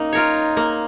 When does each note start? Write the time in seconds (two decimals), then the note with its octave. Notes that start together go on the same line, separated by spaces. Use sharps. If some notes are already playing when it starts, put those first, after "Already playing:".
Already playing: A#3 C#4 D#4
0.13 F4 A#4 C#5
0.57 A#3